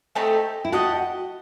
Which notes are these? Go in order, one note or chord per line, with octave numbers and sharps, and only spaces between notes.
A3 C4 D#4 G4
E4
F#4 G4 D#5 F#5 A5